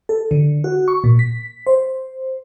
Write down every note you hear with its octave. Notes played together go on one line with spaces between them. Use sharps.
A4
D3
F#4
C#6
A#2
B6
C5